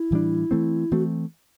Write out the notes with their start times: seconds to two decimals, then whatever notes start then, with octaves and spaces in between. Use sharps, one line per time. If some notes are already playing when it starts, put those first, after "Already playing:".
Already playing: E4
0.11 A2 E3 G3 D4
0.51 E3 A3 C4
0.91 E3 A3 C4 F#4